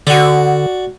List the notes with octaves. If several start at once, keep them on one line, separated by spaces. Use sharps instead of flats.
D3 F#4 D5